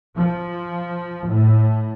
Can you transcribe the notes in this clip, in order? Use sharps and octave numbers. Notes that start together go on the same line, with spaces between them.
F3
A2